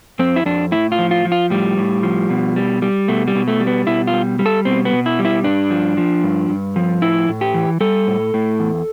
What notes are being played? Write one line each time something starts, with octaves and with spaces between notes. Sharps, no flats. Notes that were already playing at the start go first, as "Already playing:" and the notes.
F2 C4
E4
F2 D4
A2 E4
F4
F3
F4
F3
F4
A2 G3
A2
F3
B2
G3
G3
B2 A3
G3
B2
A3
G3
B3
B2 E4
F4
G3
G3
A4
B2 C4
B3
B2
E4
G3
E4
G2 D4
F3
F3
G2
G2
F3
A2 E4
A2
G4
E3
G3 A4
A2
A2
E2